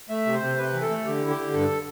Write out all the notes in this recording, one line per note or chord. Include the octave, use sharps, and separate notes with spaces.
A3 E5
C3
C5
C3
C3 B4
E3
A4
A3
D3 G4
E4
G4
D3
G2 A4